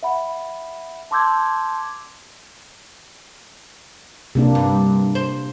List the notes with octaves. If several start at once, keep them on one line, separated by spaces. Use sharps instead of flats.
E5 F#5 B5
A5 C6 D6 E6 G6 G#6
C3 A#3 D4
G2
C5